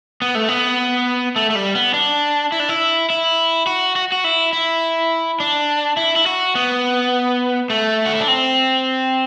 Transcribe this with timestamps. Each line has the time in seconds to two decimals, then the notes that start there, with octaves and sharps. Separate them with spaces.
0.22 B3
0.35 A3
0.48 B3
1.36 A3
1.50 A3
1.55 G3
1.75 B3
1.94 D4
2.52 E4
2.60 D4
2.69 E4
3.10 E4
3.67 F#4
3.96 F#4
4.12 F#4
4.24 E4
4.53 E4
5.40 D4
5.97 E4
6.16 E4
6.26 F#4
6.55 B3
7.70 A3
8.06 F#4
8.13 E4
8.20 D4
8.28 C4